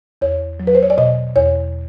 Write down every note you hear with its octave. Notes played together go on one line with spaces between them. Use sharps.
E2 C#5
F#3
B4
C5
C#5
D5
B2 D#5
E2 C#5